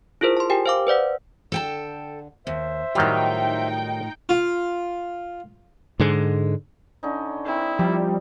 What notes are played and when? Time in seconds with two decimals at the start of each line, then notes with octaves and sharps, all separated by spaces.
0.21 E4 F4 G#4 A#4 C5
0.37 A5 C6
0.50 G4 A#4 G5 G#5
0.66 C5 F5 D6
0.87 B4 C5 D5 F#5
1.52 D3 A4 G5 A5
2.47 D#2 C5 E5
2.95 A2 D#3 F#3 G3 D#4 F4 G5
4.29 F4
6.00 G#2 D3 G#3
7.03 D3 C#4 D#4
7.46 C4 E4 A#4
7.79 F3 G3